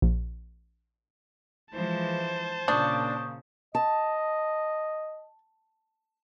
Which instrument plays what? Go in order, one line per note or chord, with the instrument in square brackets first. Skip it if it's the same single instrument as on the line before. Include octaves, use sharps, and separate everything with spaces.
[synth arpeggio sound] A#1
[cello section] E3 F3 G#3 [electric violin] C5 A5
[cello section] A#2 C#3 [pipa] D4 [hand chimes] C#6 D#6 G6
[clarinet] D#5 [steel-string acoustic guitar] A5